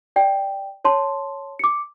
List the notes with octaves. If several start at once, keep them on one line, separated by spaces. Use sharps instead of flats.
D5 G5
C#5 A5 C6
D6 C#7